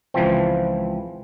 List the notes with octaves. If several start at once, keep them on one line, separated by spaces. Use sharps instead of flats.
C#2 E3 F3 C4